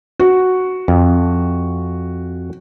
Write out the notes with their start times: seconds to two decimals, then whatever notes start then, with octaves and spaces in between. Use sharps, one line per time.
0.20 F#4
0.88 F2